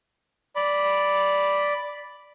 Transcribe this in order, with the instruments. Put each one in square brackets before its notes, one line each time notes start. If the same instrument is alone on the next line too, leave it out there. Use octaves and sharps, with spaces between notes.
[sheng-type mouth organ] D5 B5